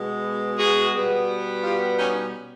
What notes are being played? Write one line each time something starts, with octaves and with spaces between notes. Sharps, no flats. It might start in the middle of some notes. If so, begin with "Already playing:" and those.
Already playing: B2 G#3 B3
F#4 G#4
B2 G3 B3
F4 G4
C#4 D#4